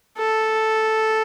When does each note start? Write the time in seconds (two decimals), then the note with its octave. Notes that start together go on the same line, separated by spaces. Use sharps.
0.17 A4